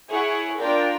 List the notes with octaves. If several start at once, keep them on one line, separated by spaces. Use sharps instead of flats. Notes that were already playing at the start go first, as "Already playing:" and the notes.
E4 G#4 C#5 F#5
D4 F4 A#4 D5 G5